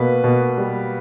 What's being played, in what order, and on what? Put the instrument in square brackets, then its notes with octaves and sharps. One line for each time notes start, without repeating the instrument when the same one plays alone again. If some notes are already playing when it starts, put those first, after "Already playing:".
Already playing: [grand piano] B2 A#3 B4
B2
G3